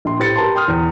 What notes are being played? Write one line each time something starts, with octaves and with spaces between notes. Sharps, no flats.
A#1 C6
A2 G4 B4 C5 A6 C#7
G4 A#4 B4 A5 A#5 C6
G5 C6 D#6 F6
E2